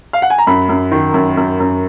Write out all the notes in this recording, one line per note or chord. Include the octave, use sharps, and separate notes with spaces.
F5
F#5
G#5
A#5
F#2 B5
F#2
D#3
F#2
F#2
F#2